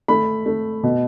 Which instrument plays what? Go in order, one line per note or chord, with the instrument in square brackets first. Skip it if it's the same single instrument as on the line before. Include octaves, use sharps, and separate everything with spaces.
[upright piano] A3 B5
A3
B2